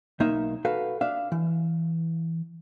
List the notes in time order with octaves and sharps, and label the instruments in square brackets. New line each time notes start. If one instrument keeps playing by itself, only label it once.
[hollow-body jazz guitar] B1 A#3 D#4 E5
F#4 A4 B4 F5
D4 E5 F5
E3